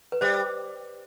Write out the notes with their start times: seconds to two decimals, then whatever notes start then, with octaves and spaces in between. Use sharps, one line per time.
0.12 B4
0.21 G3 C5